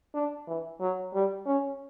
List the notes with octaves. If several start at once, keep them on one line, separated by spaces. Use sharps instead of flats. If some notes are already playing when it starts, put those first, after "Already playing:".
D4
E3
F#3
G3
C#4